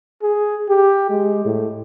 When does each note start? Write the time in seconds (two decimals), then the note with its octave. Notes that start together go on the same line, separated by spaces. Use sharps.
0.23 G#4
0.69 G4
1.10 G#3
1.45 A2